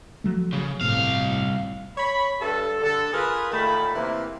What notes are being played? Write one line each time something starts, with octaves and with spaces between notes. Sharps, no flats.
F3 F#3 A3
C#3
G1 C2 A2 C3 F5
C#5 B5
G2 A4
D3 A4
F4 G#4 A#4 B4
A#2 D#3 A3 B5
C3 E3 A#3